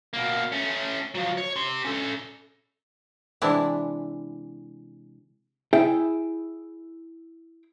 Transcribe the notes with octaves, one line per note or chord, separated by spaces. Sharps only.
B2 A#3
A3 C#4
F3 F#3
C#5
G4 C6
C#4 A4
C3 E3 G#3 D4 E4
E4 G#4 E5 G5